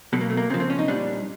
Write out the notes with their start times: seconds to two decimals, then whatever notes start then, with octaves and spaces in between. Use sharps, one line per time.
0.13 B2 F#3 B3
0.21 A#3
0.30 A3
0.37 A#3
0.50 C#3 C4
0.54 F3
0.60 C4
0.70 C#4
0.79 D#4
0.88 A#2 G3 D4